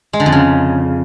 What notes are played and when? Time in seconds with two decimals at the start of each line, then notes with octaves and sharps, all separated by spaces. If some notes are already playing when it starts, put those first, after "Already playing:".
0.13 G#3
0.20 D3
0.26 F2
0.32 C#3